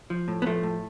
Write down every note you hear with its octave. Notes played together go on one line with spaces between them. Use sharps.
F3
A2
B3
F3 A3
A2